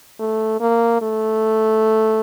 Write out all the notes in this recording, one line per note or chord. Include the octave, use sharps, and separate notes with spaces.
A3
A#3
A3